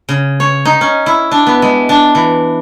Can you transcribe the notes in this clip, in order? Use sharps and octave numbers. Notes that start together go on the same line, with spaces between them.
C#3
C#5
D#4
C#4
E4
D4
B3
G#3
D4
E3